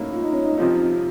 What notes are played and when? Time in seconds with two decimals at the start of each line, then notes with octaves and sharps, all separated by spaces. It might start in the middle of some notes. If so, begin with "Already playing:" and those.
Already playing: A2 F#3 A#3 C#4 D#4
0.12 F4
0.22 D#4
0.32 C#4
0.44 D#4
0.58 F2 C3 F3 C4 D#4 F4